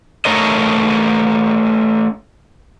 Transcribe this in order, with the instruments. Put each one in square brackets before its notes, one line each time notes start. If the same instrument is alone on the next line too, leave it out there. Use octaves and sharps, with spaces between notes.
[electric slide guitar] A3 C#4 A#4 D#5